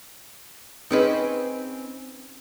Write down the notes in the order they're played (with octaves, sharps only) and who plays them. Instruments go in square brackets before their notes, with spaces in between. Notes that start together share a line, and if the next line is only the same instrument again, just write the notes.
[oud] C4 C#4 B4 [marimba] D#4 G#4 D#5